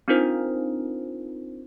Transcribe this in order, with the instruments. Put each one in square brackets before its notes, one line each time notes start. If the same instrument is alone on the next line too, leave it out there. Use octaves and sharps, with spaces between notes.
[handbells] C4 D4 D#4 F4 A#4 C5